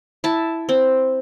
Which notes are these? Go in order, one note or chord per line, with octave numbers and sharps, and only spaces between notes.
E4 A5
C4